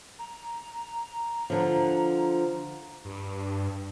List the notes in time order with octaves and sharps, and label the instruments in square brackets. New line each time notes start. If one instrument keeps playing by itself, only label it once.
[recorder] A#5
[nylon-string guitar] D3 F3
[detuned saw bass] G2